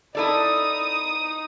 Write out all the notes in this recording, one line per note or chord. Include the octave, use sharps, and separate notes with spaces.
D#4 E4 A4 D5 D#6